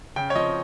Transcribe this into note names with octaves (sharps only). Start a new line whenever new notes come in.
C#3 G5
C#5
F3 C4 D#5